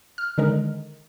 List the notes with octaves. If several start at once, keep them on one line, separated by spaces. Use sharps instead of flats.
F6
D3 D#3 G#3 A#4